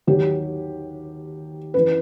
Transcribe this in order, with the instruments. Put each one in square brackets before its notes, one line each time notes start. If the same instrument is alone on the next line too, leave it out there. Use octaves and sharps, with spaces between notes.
[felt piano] D#2 D#3 F#3 G4
F#2 E3 B4